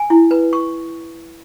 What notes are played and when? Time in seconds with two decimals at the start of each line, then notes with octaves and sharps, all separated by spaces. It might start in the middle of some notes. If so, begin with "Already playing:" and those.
Already playing: G#5
0.10 E4
0.31 B4
0.53 C#6